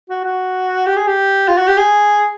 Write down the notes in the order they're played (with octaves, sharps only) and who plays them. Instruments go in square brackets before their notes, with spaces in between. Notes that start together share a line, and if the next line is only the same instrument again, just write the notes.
[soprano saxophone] F#4
F#4
G4
G#4
G4
F4
F#4
G4
G#4